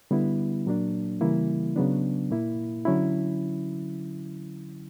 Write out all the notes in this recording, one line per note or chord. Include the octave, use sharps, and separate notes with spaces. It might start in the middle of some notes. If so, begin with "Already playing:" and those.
D3 G3 B3 E4
A#2 F#3 A#3 D4
C#3 E3 G3 A#3 E4
C#3 F#3 B3 D4
A#2 A#3 E4
D3 F#3 C#4 E4